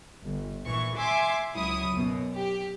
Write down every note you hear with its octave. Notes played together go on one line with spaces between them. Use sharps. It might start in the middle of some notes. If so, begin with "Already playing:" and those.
G1
A#1 E3 C#6
E5 G#5 C6 D6
C#2 F#3 E4 D#6
F#2 B2
G4